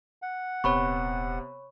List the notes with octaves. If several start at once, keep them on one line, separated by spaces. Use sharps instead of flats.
F#5
D#1 C3 B3 C#5 B5 C#6